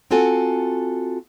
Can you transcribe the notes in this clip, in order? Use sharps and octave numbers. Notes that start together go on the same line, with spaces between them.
C4 F4 F#4 A4 G#5